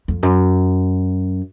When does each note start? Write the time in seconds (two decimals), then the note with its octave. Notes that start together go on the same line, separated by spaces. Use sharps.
0.08 F2
0.23 F#2